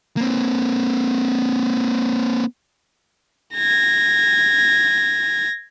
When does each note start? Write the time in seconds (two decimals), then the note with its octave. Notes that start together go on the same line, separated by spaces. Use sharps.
0.17 A#3 C4
3.55 G#6 A#6